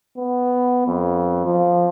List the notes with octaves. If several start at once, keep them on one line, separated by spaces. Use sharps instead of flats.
B3
F2
F3